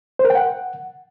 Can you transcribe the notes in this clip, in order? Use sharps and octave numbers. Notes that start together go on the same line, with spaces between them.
C5
A#4
G5
F#5